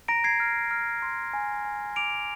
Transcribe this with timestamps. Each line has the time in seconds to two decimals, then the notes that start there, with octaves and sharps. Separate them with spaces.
0.08 A#5 A#6 D7
0.24 G#6 C7
0.40 F6
0.71 F6
1.02 C6
1.33 G#5
1.65 G#5
1.96 D6 D7 F7